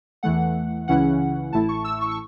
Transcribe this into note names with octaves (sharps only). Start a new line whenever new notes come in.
E2 E3 A3 F#5
C#2 C#3 E3 C#4 E4 F#5
A1 A2 A3 E4 A5
C#6
E6
C#6
C#6